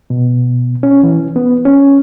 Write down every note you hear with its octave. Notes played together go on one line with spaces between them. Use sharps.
B2
C#4
E3
B3
C#4